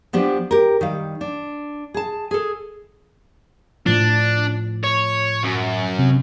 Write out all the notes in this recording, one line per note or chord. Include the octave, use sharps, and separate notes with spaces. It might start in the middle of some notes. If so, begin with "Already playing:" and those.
F3 B3 D4 G4
G4 A#4
D#3 G3 F5
D4
G#4 A5
G#4 A4
A2 F3 D4
C#5
F#2
C3